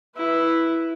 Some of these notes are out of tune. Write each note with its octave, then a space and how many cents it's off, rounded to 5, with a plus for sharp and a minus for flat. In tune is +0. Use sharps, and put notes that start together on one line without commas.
E4 +0 B4 +0